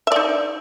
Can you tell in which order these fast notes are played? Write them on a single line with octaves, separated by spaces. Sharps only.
E5 D5 D#4